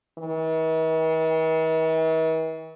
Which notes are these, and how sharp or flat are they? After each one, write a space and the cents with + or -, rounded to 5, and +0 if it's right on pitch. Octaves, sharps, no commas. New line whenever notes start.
E3 -45